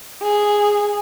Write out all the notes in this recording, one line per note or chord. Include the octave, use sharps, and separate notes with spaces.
G#4